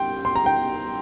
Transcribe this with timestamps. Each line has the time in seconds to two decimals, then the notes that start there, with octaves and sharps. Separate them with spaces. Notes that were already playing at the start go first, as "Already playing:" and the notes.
Already playing: G3 G5 C6
0.25 C6
0.36 A#5
0.46 G5